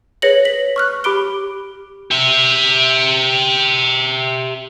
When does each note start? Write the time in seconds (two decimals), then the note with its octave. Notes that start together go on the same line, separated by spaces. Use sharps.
0.22 G#4 B4 C#5 A#6 C#7 F#7
0.45 B6 F#7
0.76 C#6 F6 F#6
1.04 G4 B5 D6 D7 G7
2.11 G4 E5